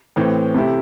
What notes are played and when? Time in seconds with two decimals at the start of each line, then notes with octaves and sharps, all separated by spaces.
0.16 A2 E3 C4
0.54 C3 A3 E4 G4